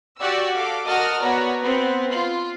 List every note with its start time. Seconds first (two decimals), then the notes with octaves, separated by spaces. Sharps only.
0.20 F#4 G4 D5 E6
0.55 A4 F5 D6
0.87 F#4 A#4 D#5 A5 D#6 F6
1.19 B3 F#4 C#5 D5 A#5
1.61 B3 C4
2.11 F4